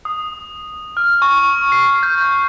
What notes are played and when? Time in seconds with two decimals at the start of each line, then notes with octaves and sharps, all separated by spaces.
0.05 D#6
0.97 F6
1.22 C#6
1.72 C7
2.03 G6